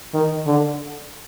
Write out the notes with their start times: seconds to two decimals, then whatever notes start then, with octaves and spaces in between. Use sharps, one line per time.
0.13 D#3
0.46 D3